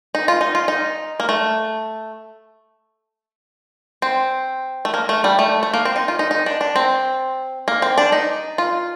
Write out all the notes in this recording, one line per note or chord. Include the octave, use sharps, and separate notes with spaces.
D#4
F4
D#4
F4
D#4
A#3
A3
C4
A3
A#3
A3
G3
A3
A3
A#3
C4
D#4
F4
D#4
D#4
D4
D4
C4
A#3
C4
D4
D#4
F4